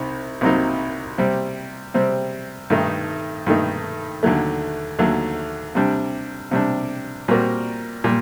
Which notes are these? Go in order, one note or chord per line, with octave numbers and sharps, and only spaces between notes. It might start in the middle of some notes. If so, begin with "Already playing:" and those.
Already playing: C2 C3 D#4
C2 C3 F#3 A#3 D#4
C3 G3 C4
C3 G3 C4
G2 D#3 A3 D#4
G2 D#3 A3 D#4
D#2 D3 F#3 A3
D#2 D3 F#3 A3
C3 G3 D4
C3 G3 D4
A#2 G3 C4 F#4 A#4
A#2 G3